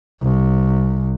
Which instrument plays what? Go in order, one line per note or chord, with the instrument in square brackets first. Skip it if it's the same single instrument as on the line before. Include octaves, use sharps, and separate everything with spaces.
[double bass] C2